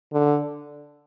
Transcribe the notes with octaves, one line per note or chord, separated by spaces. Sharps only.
D3